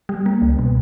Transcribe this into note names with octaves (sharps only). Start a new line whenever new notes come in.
G3
A#3
C#2
B2